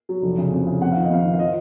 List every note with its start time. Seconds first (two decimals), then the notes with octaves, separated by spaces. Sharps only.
0.09 F#3
0.22 F1
0.38 C#3
0.52 F2
0.67 C#3
0.81 F2 F#5
0.92 D#3 F5
1.04 D#5
1.10 F2 F5
1.24 D#3
1.34 F5
1.39 F3 D#5